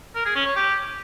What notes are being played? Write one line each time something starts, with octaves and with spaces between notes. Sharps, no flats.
A#4
G#4
C#4
C#5
G4